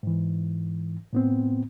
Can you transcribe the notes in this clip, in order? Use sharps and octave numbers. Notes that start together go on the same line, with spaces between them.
G#2 E3
A2 B3 C4